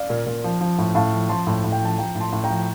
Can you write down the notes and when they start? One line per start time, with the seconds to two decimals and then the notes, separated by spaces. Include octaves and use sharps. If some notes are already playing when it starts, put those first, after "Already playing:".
Already playing: D5 F5
0.10 A#2
0.26 A#2
0.44 F3
0.61 F3
0.78 A2
0.95 A2 F5 A5
1.12 F3
1.29 F3 A5 C6
1.47 A2
1.64 A2
1.72 G5
1.81 F3 A5
1.98 F3 G5 A#5
2.15 A2
2.20 A5 C6
2.32 A2
2.44 G5 A#5
2.50 F3